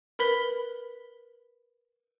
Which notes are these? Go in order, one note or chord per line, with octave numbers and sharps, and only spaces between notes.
A#4 B4 B5 B6 G7